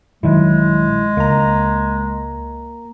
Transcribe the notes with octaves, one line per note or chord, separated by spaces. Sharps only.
A#1 D#3 F#3 G#3 E4
C#2 A#3 A#5